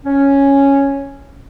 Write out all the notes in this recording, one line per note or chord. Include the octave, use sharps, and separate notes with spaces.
C#4